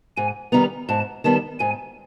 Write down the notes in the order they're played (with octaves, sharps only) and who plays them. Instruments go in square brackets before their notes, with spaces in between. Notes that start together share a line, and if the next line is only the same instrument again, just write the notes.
[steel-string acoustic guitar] G#2 [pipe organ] G#5
[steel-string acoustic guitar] D#3 G3 B3 [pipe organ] A#5
[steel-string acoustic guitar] G#2 [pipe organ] A5
[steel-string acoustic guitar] D#3 G3 B3 [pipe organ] A5
[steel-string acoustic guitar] G#2 [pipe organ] G#5